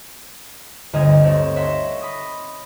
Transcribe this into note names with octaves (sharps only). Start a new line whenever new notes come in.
G1 D2 C4 D#5 A#5 G#6
A3 C4 D#4 A4 C#5
C#5 E5 F#5 C6 A#6
B5 D#6 A#6